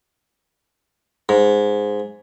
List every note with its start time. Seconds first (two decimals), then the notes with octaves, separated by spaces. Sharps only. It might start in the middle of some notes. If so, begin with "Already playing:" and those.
1.29 G#2